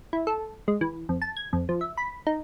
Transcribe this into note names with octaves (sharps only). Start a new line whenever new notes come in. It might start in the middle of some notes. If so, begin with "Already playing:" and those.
E4
A4
G#3
E3
F2
A5
G#6
F2
F3
E5
B5
D#4